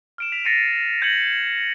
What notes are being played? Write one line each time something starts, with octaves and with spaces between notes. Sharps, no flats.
F6 D7 E7
B6 F7
A6 A#6 C7 C#7 D#7
G6 G#6 A#6 C#7 D7 F#7